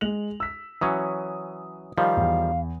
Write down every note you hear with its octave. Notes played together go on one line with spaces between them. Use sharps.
G#3 F7 F#7
E6 B6
E3 F#3 C#4 D#6
D#3 F3 G3 F5
E2